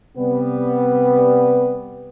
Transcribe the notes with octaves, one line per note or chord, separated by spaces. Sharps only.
C3 G3 B3